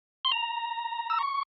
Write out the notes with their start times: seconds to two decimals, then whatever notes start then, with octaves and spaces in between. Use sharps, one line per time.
0.25 C6
0.32 A#5
1.10 E6
1.19 C#6